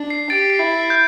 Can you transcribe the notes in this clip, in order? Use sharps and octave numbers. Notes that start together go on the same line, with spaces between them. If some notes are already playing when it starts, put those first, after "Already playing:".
Already playing: D4
C7
G4 A6 D7
C7
E4
G6